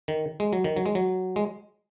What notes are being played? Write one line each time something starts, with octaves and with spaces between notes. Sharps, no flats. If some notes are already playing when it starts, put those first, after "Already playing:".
D#3
G#3
F#3
D#3
F#3
G#3
F#3
G#3